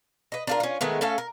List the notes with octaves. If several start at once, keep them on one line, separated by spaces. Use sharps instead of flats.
B4 D#5
D4 F4 A#4
C#4 F4
D#3 G#3 A3 B3
A3 C#4 A4 F5
A#4